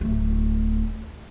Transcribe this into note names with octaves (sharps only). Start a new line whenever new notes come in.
D1 A3